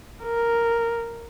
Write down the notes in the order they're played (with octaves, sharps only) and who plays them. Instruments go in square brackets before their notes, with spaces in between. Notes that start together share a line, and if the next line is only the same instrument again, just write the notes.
[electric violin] A#4